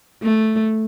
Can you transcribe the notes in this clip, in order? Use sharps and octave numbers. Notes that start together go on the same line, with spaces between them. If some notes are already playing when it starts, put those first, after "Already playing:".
A3